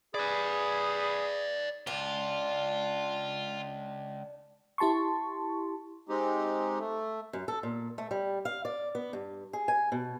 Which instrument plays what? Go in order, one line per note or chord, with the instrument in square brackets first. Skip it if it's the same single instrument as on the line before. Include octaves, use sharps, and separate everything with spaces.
[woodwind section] G#4 [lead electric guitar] B4 D5 [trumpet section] B5
[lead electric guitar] C#2 [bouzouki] D4 [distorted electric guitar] F4
[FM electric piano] E4 G4 A5 C6 C#6
[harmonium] G#3 C4 D#4 G4
A3
[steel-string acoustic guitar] F#2
A4
A#2
A3
G3
F5
D5
B3
G2
G#4
G#5
B2